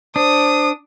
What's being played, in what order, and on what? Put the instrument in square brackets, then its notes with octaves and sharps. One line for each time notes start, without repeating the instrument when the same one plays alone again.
[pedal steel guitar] D4 [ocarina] C5 [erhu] D#6